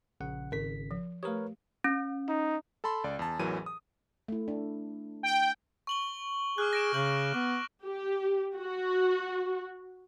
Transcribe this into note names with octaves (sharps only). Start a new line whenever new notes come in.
A#1 C#3 F#5
G#1 C#3 A#4 B6
F3
A3 G4 A#4 B4 C#5
C#4
D#4
A4 A5 B5 C6
C#2 D5
E2 A5
A1 E2 E3 F#3 A#4 D#7
D#6
A3 E4
D4
G5
C#6 F#7 G7
G#4 D6 F6 F#6
A#6 D7 E7
C#3 G6 F#7
B3 D6
G4
F#4